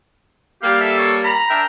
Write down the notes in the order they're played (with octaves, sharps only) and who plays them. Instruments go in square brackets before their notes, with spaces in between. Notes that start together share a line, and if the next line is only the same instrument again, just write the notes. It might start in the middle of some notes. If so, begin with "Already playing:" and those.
[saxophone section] G3 A#3 [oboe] G4 [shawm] F5
[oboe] A4 [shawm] E5
[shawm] C#5
[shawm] A#5 [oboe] B5
[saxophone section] D4 A#4 E5 [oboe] G5